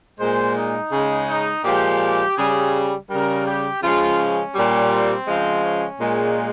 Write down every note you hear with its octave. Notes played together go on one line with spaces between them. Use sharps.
A#2 G#3 C5
D#4
C#3 G#3
D#4
A#2 F3 G#3 G4
C#3 G3 G#4
C#3 G3 A#4
G4
C#3 F3 G#3 F4
C#4
A#2 G3
C4
C#3 F3 G#3
C#4
A#2 G#3